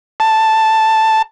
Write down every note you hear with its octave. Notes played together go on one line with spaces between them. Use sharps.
A5